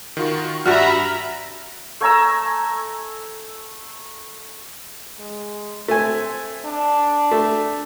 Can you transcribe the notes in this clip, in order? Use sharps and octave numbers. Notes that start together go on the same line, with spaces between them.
D#3 F4 F#4
G2 G3 F#4 E5 A#5 B5 F6
A3 G#5 A#5 E6
G#3
A3 C4 G#5
D4
A3